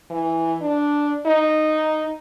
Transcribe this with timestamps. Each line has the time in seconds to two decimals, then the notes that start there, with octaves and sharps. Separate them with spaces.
0.10 E3
0.61 D4
1.26 D#4